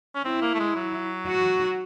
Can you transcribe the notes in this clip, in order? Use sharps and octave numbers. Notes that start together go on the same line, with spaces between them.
C#4
C4 E4
A#3
A3
G#3
F#3
F#4